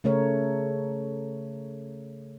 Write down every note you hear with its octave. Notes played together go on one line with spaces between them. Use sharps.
C#3 A3 A#4 C#5